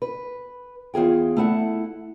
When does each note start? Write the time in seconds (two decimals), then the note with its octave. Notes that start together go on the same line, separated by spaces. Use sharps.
0.02 B4
0.94 E2 F4 G#4 G5
1.37 A3 E4 F#5